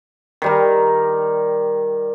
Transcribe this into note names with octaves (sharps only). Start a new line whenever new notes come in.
D#3 G3 A#4